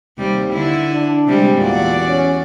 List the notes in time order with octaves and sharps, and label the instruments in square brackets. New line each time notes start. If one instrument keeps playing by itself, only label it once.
[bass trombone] D#2 [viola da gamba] C3 G3
[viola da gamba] D3 E4
[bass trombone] D4
[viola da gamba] C3 G3 G#3
[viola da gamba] E2 F#4 D5 [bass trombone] A#2
[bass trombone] C#4